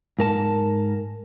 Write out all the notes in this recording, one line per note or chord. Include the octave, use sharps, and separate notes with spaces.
G#2 A#4 A5